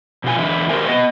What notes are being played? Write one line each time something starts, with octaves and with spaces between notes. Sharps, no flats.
B2 F3 F4 G#5
E2 D3 E4
F#4 G4 A#4 C5 E5 G#5
B3 D#5